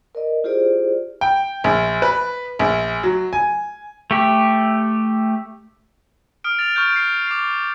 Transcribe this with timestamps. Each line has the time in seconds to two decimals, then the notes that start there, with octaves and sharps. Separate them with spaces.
0.15 A#4 D5 D#5
0.44 E4 F4 G4 G#4 C5 D5
1.21 G5
1.64 A#1
2.02 B4
2.59 A#1
3.03 F#3
3.33 G#5
4.11 A3 G4
6.44 D#6 F6 D7
6.59 A6 D7 F7
6.75 C#6 F6 G6 D7
6.96 C7
7.27 D6 C7